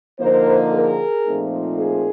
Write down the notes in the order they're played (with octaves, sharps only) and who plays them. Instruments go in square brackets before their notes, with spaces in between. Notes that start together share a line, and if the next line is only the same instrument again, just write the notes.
[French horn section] D3 F3 A#3 D#4 A#4 C5
G#4 A#4
A#2 F3 A3 C4 D#4
G#4 A#4